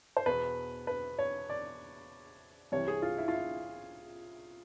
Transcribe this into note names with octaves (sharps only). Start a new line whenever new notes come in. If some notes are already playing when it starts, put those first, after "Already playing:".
C5
E2 B2 B4
B4
C#5
D5
C2 C3 E3 C#5
G#4
F4
E4
F4
E4